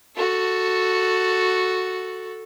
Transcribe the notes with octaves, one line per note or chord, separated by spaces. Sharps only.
F#4 A4